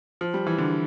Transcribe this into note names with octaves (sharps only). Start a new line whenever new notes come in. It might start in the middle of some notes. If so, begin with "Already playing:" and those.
F3
G3
E3
D3